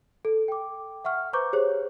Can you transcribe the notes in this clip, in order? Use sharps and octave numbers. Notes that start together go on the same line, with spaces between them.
A4
G5 D6
E5 F#5 C#6 F6
B4 C5 A#5 C#6 D6 G6
G4 G#4 C5 C#5